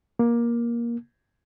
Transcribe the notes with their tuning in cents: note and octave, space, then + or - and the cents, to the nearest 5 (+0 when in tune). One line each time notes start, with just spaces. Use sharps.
A#3 +15